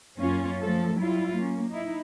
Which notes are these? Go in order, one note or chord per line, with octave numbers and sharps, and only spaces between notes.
F#2 A#3 C#4 F4
F3 A3 A4
F#3 G3 E4 F4
A#3 C#4
D#4 E4